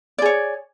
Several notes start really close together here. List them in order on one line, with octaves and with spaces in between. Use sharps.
D5 G#4 C#5